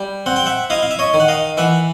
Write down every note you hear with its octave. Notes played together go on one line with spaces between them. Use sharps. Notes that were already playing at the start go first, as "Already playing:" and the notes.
Already playing: G3
C4 F#5
G5
E5 F#5
E4 D#5 F5
F5
E5
C#5 D#5
D#3
F#5
D#5 F5
E3 E5 F#5